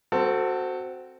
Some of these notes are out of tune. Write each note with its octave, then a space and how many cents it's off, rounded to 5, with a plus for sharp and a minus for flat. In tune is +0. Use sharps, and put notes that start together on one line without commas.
C4 -10 F#4 +0 A4 +20